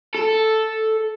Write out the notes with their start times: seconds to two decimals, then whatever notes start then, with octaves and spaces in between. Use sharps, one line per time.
0.15 A4